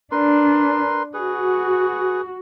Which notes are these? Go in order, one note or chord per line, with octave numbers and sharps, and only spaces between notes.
D4 A#4 B4 C6
F#4 G#4 B4